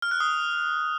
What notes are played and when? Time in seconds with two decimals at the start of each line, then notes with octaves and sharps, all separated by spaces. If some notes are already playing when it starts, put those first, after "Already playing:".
0.02 F6
0.11 F#6
0.20 D#6